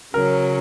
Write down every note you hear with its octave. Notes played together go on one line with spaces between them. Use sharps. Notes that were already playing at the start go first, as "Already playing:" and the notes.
C#3 F#3 C#4 A#4